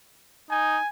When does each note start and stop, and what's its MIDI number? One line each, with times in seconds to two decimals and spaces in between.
0.51 0.77 63
0.51 0.89 80